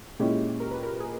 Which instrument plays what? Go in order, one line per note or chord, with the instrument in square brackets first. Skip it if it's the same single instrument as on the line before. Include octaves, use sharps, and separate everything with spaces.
[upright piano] A#2 G#3 C#4 E4 [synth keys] G4
[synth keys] A#4
B4
A#4
G#4